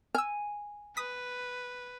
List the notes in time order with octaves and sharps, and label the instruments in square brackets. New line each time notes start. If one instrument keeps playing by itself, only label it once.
[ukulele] G#5 [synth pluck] E6 F6
[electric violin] B4 [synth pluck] D#6 B6